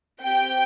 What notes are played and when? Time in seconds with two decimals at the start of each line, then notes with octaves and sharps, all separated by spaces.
0.22 C4 G4 G5